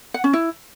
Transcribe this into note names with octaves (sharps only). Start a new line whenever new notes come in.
F#5
C#4
E4